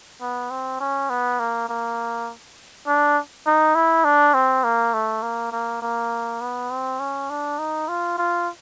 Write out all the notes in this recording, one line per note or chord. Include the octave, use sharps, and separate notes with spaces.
B3
C4
C#4
B3
A#3
A#3
D4
D#4
E4
D4
C4
A#3
A3
A#3
A#3
A#3
B3
C4
C#4
D4
D#4
F4
F4